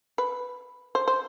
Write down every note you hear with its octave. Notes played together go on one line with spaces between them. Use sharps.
B4
C5
C5